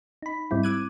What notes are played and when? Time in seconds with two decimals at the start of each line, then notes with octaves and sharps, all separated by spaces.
0.22 D#4 B5
0.51 G#2 G3 C4 E4
0.63 D6 E6 F#6 G#6 D#7